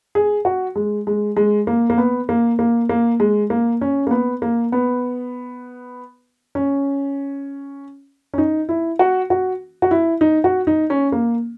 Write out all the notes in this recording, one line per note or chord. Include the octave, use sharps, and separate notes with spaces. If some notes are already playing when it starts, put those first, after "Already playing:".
G#4
F#4
G#3
G#3
G#3
A#3
A#3
B3
A#3
A#3
A#3
G#3
A#3
C#4
A#3
B3
A#3
B3
C#4
C#4
D#4
E4
F#4
F#4
F#4
E4
D#4
F#4
D#4
C#4
A#3